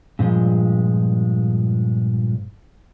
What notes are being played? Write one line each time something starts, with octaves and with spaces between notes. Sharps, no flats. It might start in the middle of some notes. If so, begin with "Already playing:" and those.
G2 A#2 F3 G#3